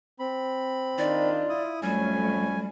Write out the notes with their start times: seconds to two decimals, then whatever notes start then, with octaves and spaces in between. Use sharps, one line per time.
0.19 C4 B5
0.98 D#3 D4 D#4 F4 D5
1.49 E4 D#6
1.82 F2 A2 F#3 G3 A3 C#4 G#5